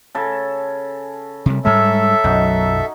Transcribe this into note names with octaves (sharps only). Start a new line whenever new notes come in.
C#3 A4
C3 G3
G#2 G3 G#3 A4 A#4 C#5 E5
B1 F#2 D#4 F#4